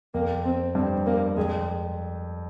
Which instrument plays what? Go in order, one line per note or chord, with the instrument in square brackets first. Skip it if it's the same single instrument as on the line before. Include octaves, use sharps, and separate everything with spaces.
[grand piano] F2 [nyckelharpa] A#3
[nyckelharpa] C4
[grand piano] G2 [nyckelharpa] C4
[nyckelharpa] A#3
[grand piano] F2 [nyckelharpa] G#3